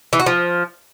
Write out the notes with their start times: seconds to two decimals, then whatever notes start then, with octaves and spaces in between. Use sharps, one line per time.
0.13 E3
0.20 F#4
0.26 F3